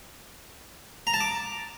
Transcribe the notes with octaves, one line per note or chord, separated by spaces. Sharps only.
A#5
A5
D6